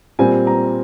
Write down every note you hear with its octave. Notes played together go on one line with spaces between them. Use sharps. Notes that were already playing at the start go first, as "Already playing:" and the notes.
A#2 G3 C4 G#5
A#5